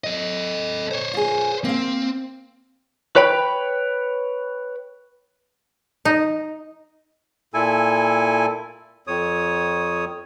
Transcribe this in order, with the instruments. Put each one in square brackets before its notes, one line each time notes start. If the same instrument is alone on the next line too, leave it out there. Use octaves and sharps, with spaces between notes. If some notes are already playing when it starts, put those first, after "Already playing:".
[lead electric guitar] A4 D#5
C5 C#5
[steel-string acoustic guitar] F4 G#4
[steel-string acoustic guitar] A#3 F5 [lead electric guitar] C4
[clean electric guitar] B4 C#5 G5 B5
[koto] D#4
[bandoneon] A#2 E4 A4 G#5
F2 C#5 D#6